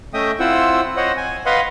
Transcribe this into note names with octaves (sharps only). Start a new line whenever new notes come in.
A3 C#4 D#5 E5 G5 D#6
C4 E4 F4 C5 F#5 E6
C5 C#5 D#5 F#5
G#5
B4 D#5 F5 F#5 B5 C6